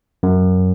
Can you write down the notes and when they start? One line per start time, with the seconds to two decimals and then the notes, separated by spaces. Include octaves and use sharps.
0.23 F#2